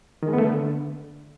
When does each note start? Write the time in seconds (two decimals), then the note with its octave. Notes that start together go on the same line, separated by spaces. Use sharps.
0.23 D#3
0.28 G#3
0.33 B3
0.38 A3
0.44 D3